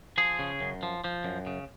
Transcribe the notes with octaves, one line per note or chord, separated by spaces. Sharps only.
F3 G#4
C#3
F#2
F3
F3
F#2
C#3